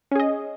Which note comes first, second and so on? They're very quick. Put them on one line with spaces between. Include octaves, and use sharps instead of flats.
C#4 G#4 D#5